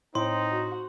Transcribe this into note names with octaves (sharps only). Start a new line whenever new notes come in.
A2 C4 D#4 C6
F#4